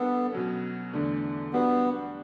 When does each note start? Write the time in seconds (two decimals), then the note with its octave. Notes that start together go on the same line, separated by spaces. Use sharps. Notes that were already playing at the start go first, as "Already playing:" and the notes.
Already playing: G3 B3 D4 A4
0.32 B2 F#3 C#4
0.93 E2 D3 A3 D4
1.53 G3 B3 D4 F#4